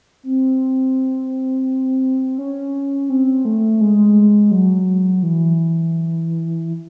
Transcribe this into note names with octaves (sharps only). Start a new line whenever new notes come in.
C4
C#4
C4
A3
G#3
F#3
E3